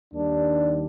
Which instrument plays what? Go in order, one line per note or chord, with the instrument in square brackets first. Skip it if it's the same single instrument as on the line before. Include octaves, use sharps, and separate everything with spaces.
[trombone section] D#2 D#3 G3 D4